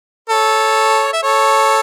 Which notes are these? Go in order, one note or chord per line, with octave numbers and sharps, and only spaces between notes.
A4 C#5
E5
A4 C#5